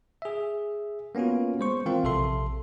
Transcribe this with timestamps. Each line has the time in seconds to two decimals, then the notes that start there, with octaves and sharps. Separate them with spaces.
0.22 G#4 E5
1.15 A#3 B3 C#4 F4 F#4
1.60 G#3 C5 C#6
1.86 E3 C4 F4 A#4 F5
2.04 A#1 C3 A4 E5 C6